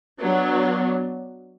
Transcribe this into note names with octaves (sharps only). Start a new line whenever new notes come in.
F#3 B3 D4